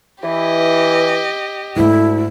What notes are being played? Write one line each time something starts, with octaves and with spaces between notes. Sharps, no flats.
E3 G4 D#5
D2 G#2 A3 E4